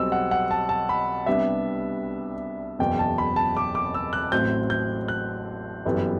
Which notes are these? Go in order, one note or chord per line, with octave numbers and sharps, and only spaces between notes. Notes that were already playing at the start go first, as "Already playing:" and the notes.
Already playing: B1 B2 G3 C4 E6
F#5
F#5
A5
A5
B5
C2 C3 G3 B3 D4 E5
F#1 E2 B2 G5
A5
B5
A5
D6
D6
E6
F#6
A1 A2 F#3 C4 G6
G6
F#6
G1 F#2 E3 G3 B3